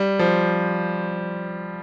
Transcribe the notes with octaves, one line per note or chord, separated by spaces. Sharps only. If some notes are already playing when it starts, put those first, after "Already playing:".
Already playing: G3
F3